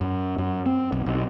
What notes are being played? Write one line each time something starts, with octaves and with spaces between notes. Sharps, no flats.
F#2
F#2
C4
B1
B1